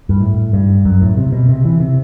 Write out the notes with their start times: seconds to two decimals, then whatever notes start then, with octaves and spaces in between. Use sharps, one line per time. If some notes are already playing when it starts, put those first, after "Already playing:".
0.09 G2
0.20 A2
0.53 G2
0.85 F#2
1.01 A2
1.17 C3
1.32 B2
1.49 C3
1.65 E3
1.80 C3